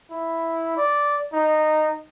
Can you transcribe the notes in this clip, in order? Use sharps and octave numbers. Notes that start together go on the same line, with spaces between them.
E4
D5
D#4